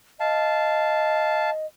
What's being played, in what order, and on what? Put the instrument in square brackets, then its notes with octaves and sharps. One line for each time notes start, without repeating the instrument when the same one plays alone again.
[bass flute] D#5 [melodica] F5 A5